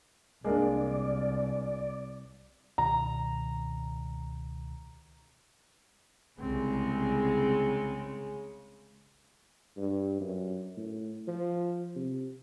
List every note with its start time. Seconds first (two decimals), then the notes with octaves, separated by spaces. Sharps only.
0.44 C2 G#3 A#3 D4 D5
2.78 C#2 B2 D#3 A#5
6.40 C2 C#3 G#3 C4
9.77 G2
10.20 F#2
10.77 A2
11.28 F3
11.96 C3